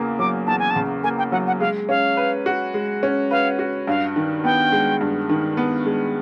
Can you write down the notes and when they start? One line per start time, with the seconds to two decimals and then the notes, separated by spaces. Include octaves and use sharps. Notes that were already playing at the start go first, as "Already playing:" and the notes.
Already playing: E2 C#3 A#3
0.19 F#3 D6
0.47 E2 A5
0.59 G#5
0.71 A5
0.76 C#3
1.04 A#3 G#5
1.18 G5
1.32 F#3 F#5
1.47 F#5
1.60 G#3 F5
1.89 C#4 F5
2.17 B4
2.46 F#4
2.74 G#3
3.03 C#4
3.31 B4 F5
3.59 F#4
3.87 G2 F5
4.16 D#3
4.44 B3 G5
4.72 G#3
5.01 G2
5.29 D#3
5.57 B3
5.86 G#3